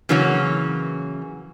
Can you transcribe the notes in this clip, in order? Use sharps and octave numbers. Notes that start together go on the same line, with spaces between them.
C#3 E3 F#3 A#3 C#4